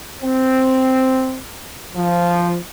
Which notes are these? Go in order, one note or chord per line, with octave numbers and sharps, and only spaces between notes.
C4
F3